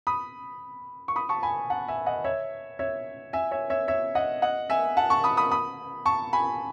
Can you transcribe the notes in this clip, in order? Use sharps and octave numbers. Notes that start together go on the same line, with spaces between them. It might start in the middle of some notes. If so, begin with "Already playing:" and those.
B5 D#6
C#6
B5 D#6
A5 C#6
G#5 B5
F#5 A5
E5 G#5
D#5 F#5
C#5 E5
C#5 E5
E5 G#5
C#5 E5
C#5 E5
C#5 E5
D#5 F#5
D#5 F#5
E5 G#5
F#5 A5
A5 C#6
B5 D#6
B5 D#6
B5 D#6
A5 C#6
G#5 B5